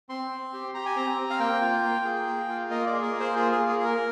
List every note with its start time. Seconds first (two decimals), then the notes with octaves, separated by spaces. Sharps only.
0.09 C4 C6
0.31 C4
0.53 G4
0.74 G4 A#5
0.86 G#5
0.96 C4 A#5
1.18 C4
1.30 F5
1.40 A#3 G5
1.61 F4
1.83 A#3
2.05 G#4
2.27 A#3
2.49 F4
2.71 A#3 D#5
2.87 D5
2.92 G#4
3.03 A#4
3.14 A#3
3.20 C5
3.36 F4 G#4
3.52 A#3 G#4
3.68 G#4
3.79 G#4
3.85 A#4